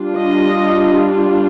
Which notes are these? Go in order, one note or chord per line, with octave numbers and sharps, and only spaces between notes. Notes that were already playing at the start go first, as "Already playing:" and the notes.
Already playing: G3 D4 F4
D#5